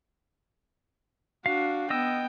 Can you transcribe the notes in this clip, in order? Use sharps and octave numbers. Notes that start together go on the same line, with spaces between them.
D4 F#4 F5
B3 D#5 G5 E6